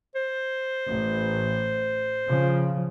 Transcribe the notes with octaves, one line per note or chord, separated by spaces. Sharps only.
C5
A1
C#3 F3